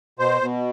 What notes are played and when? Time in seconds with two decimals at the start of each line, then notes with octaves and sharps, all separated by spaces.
0.19 B2 C5
0.42 B2